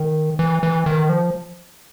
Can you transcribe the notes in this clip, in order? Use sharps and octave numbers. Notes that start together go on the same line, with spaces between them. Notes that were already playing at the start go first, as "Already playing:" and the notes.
Already playing: D#3
E3
E3
D#3
F3